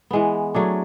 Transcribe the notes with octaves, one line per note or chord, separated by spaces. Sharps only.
E3 G#3 B3
F#3 A3 D4 G#4